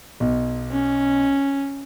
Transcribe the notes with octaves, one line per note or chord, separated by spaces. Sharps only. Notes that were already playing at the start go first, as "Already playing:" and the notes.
B1
C#4